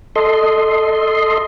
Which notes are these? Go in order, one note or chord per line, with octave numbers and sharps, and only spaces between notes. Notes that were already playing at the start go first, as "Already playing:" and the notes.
A4 D#5 C6